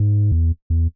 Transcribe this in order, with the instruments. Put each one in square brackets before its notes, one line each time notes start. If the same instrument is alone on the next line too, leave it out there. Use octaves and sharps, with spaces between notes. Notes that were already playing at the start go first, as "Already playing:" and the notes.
Already playing: [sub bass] G#2
E2
E2